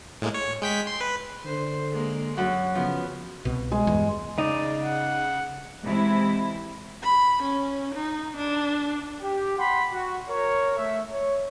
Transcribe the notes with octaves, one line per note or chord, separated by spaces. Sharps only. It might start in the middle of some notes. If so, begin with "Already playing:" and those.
A2 G#3 A#3
C#5
G#3 G5 B6
C6
B4
D3 C5
G#3 A#3
F#2 F#4 F#5 F#6
C#3 F3 B3
C2 B2
G#3
E2 G2
C#3 D#4 D5
F#5
C3 E3 G#3 E4
B5
C#4
D#4
D4
G4
F#5 G5 B5 C6
F#4
A#4 C#5
A3 E5
C#5